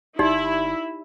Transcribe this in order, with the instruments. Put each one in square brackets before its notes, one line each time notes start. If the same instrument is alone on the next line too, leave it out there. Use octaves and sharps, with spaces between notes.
[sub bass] G1 [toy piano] D#4 G4 D5 [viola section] E4